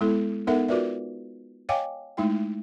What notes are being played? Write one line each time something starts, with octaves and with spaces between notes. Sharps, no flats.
G#3 B3 E4 A4
B3 D#4 A4 A#4 E5 F#5
F4 F#4 A#4 B4 D5 E5
C#5 D#5 F5 G5 G#5 D6
G#3 A3 D#4 E4 G5